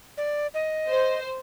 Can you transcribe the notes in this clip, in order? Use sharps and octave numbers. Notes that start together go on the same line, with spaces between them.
D5
D#5
C5